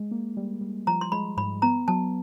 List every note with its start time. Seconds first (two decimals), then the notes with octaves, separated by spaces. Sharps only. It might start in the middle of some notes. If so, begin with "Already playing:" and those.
Already playing: G#3
0.11 A#3
0.37 G3
0.61 G3
0.87 F3 A#5
1.01 C6
1.12 G#3 B5
1.37 G#2 B5
1.62 B3 A#5
1.88 F#3 A5